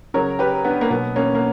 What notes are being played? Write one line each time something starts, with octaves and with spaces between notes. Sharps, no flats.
C#3 F#3 A#4 C#5
G4 B4
B3 D4
A#3
B2 F#3 B3
A#3 C#4
A#3